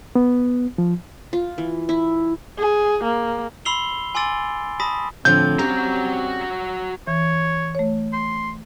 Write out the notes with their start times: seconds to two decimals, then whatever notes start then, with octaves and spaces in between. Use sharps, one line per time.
0.15 B3
0.78 F3
1.33 F4
1.58 E3
1.89 E4
2.58 G#4
3.03 A#3
3.65 B5 C6 E6 C7 F7 G7
4.15 G#5 C6 D6 E6 A6 D7
4.80 A5 B5 D#6 A#6 B6
5.25 A2 D3 F3 C4 G6
5.59 C#3 G3 F#4 G4 A#5
7.07 E3 C#5
7.75 A3 C#5
8.13 C6